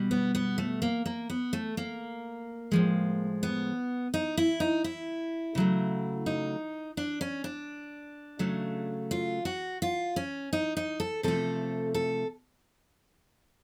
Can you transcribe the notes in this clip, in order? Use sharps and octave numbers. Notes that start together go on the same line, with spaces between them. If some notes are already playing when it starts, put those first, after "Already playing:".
Already playing: B2 G3
B3
B3
A3
A#3
A#3
B3
A3
A#3
A2 F3 G#3
B3
D#4
E4
D#4
E4
C#3 F#3 A3
D#4
D4
C#4
D4
C#3 F#3 A3
F4
F#4
F4
C#4
D#4
D#4
A4
C3 F3 A3 A4
A4